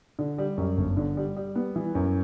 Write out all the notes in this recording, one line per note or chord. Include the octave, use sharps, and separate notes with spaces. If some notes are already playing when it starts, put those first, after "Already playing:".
D3
G3
F#2
G1
D3
G3
G3
B3
E3
F#2